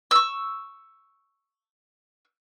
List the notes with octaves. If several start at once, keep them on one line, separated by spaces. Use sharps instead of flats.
C#6 E6